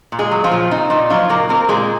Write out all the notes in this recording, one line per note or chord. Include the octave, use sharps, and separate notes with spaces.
A#2
G#3 G#4
F#3
F3 F4
A#2
C4 D#4
A#2 D#4
F3 F#3 F4
A#2 A#3 A#4
A#3 C4 A#4
A#2 G#3 G#4